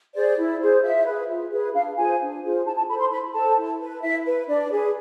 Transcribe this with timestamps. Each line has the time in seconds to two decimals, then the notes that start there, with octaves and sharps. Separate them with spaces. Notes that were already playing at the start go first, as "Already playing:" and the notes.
0.14 G#4 C5 D5
0.38 E4
0.60 G#4 C5
0.83 F4 E5
1.06 G#4 B4
1.29 F4
1.51 G#4 B4
1.74 D4 F5
1.97 F4 G#4 C5 G#5
2.20 D4
2.43 F4 G#4 C5
2.66 E4 A5
2.77 A5
2.88 A4 B5
2.92 C5
3.00 C6
3.11 E4 B5
3.34 A4 C5 A5
3.57 E4
3.80 B4
4.02 E4 E5
4.25 B4
4.48 D4 D5
4.71 G#4 B4